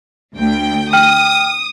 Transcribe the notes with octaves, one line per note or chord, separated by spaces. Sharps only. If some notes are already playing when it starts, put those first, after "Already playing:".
D2 G5
G5 D#6 F6 D#7